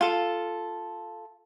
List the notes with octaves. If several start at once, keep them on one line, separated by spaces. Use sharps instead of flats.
F4 A4